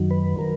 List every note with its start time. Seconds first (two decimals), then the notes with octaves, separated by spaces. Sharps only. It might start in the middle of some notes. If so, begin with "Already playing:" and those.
Already playing: F#2 D#3 F#3
0.11 B4
0.39 D#3 F#3 A#4